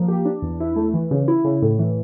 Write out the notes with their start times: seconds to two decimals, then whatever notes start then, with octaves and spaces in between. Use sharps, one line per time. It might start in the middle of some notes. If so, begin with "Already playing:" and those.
Already playing: F3 A#3
0.08 G4
0.25 D4
0.42 E2
0.60 E4
0.76 A3
0.94 E3
1.11 C#3
1.28 E4
1.44 C#3
1.62 A2
1.79 E3